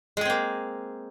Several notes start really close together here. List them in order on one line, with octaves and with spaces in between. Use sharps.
G#3 G#4 C4 A#3